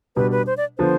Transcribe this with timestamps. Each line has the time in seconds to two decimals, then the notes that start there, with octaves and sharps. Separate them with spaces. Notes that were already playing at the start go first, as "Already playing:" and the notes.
0.16 B2 G3 D4 B4
0.31 B4
0.47 C5
0.57 D5
0.78 D3 F3 B3 C5